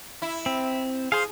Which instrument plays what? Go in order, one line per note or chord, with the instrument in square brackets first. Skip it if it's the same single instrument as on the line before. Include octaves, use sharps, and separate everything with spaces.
[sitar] E4
[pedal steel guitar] C4
[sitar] G#4 [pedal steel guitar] C5 F5